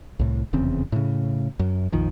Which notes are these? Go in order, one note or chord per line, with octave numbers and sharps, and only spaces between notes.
C2 A2
F1 E2 C#3 C4
A2 C#3
F#2
A#1 F2 D#3 F3